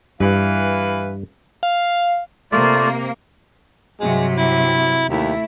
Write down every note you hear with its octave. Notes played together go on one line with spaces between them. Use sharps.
G2 E3 B4 F5
F5
C3 A3 A#3 F4 D5
G2 C3 F#3 G#3
E4
D#2 A3 E4